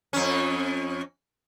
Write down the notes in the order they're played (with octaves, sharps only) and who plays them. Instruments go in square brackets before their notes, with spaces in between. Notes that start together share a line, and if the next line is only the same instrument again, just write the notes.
[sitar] F2 C#4